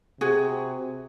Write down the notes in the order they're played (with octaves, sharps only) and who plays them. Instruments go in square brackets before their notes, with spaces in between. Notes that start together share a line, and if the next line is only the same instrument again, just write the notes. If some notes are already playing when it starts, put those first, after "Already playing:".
[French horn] C3 [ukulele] F#4 G#4